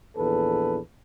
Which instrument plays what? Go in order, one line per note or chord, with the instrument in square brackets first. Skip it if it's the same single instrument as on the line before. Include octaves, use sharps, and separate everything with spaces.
[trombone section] A#1 E2 A4 B4